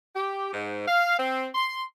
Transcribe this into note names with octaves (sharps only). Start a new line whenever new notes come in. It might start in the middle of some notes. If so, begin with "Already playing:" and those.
G4
G#2
F5
C4
C6